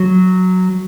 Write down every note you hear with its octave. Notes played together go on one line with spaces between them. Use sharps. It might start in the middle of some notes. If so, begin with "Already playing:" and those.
Already playing: F#3